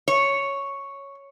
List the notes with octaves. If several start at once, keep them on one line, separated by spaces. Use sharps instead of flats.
C#5